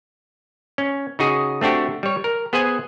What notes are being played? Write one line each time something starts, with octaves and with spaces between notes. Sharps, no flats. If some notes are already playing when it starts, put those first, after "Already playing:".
C#4
C#3 D#4 F#4 G#4
A3 C4 D4 F#4 G4
G3 C#5
A#4
B3 G#4 C5 F#5 G#5